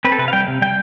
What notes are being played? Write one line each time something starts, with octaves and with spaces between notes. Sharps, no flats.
C4 B4
A4
C3 B4
F5
G3 G5
C3
G3 G5